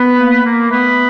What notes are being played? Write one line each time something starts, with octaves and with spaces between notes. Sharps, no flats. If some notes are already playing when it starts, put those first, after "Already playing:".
Already playing: B3 B4
A#3
A#3
A3 B3 B4